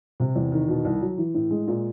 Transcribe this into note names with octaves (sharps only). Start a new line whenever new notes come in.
C3
E2
D#3
B2
C2
F#3
E3
A2
G#3
A#2